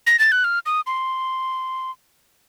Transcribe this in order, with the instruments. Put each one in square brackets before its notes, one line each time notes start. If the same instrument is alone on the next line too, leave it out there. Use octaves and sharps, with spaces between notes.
[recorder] A#6
A6
F#6
F6
D#6
C6